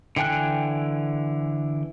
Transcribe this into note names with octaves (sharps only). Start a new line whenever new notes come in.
D3 E3 G5 G#5 F#6